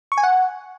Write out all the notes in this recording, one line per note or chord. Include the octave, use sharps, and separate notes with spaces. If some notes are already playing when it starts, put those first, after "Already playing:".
C#6
G#5
F#5